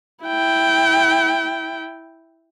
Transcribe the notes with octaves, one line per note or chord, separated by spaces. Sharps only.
E4 G5